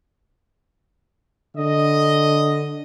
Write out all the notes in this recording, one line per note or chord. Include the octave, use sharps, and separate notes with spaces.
D3 D#5